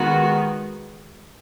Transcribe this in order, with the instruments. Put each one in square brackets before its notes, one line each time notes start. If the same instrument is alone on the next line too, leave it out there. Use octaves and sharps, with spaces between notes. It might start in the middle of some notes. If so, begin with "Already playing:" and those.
Already playing: [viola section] D#3 G#3 B3 F#4